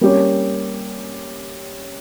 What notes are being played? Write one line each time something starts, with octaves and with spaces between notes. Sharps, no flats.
G3 A#3 C#4 G4 C#5